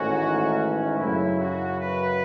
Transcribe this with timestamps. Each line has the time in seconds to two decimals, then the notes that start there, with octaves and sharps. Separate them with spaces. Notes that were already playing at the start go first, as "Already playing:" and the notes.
Already playing: A1 G#2 D#3 A3 C#4 F#4
0.97 F#2 C#3 F#3 E4
1.38 F#4
1.78 B4